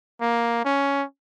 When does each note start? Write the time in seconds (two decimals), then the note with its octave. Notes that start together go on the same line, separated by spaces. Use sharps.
0.21 A#3
0.65 C#4